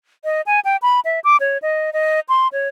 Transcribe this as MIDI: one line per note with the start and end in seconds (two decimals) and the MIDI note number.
0.24 0.41 75
0.46 0.60 80
0.65 0.77 79
0.82 1.00 83
1.05 1.20 76
1.24 1.37 86
1.40 1.58 73
1.62 1.90 75
1.93 2.20 75
2.29 2.48 84
2.53 2.68 73